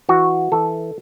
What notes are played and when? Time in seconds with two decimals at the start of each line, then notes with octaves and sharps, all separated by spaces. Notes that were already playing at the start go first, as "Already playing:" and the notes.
0.09 E3 F#4
0.52 E3 A4